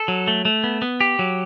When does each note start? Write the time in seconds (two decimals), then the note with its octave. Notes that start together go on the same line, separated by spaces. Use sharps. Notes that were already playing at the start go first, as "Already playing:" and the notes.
Already playing: A4
0.08 F#3
0.28 A3
0.45 A3
0.64 B3
0.82 B3
1.01 G4
1.19 F#3